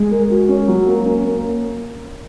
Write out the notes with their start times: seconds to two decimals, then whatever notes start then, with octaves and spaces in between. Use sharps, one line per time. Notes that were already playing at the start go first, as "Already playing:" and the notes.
Already playing: G#3
0.11 A#4
0.30 F#4
0.48 C#4
0.68 F#3
0.87 A#3
1.05 C#4
1.24 A#3